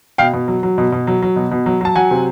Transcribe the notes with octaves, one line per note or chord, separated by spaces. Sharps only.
B2 F5 G5
B2
F#3
F#3
B2
B2
F#3
F#3
B2
B2
F#3
F#3 A5
F#3 F#5 G#5
C3